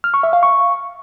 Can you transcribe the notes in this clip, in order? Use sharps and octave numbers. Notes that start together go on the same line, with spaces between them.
F6
C#6
E5
F5
C#6